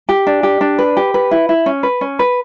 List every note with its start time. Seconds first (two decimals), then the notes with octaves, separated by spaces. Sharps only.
0.09 G4
0.27 D4
0.43 G4
0.61 D4
0.79 B4
0.97 G4
1.14 B4
1.31 E4
1.49 E4
1.66 C#4
1.83 B4
2.01 C#4
2.19 B4